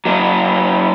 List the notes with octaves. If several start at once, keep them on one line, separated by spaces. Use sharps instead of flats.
F#3 A#3